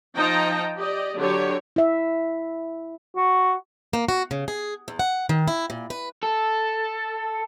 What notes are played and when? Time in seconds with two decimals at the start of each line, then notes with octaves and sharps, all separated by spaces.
0.16 F3 D#4 D#5 G5 A5 A#5
0.78 G4 D5 D#5
1.17 D3 F#3 G4 C#5
1.76 E4 E5
3.16 F#4
3.93 A#3
4.09 F#4
4.31 C#3
4.48 G#4
4.88 E2
4.99 F#5
5.29 D#3
5.48 E4
5.70 A#2
5.90 B4
6.23 A4